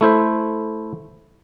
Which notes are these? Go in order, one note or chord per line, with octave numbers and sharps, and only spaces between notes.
A3 E4 C5 E5